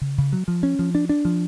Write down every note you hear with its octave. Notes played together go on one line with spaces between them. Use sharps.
C#3
C#3
F#3
F3
C#4
F3
D4
D4
F3